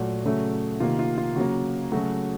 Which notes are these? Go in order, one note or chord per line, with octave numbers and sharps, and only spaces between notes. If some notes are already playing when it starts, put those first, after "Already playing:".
Already playing: A#2 F#3 A3 F#4
C#3 F#3 A3
C3 D#3 A#3 F4
F4
F4
C#3 F#3 A#3 F#4
C#3 F#3 A3 F#4